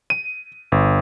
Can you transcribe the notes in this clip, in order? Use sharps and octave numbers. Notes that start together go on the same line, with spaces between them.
D#7
G1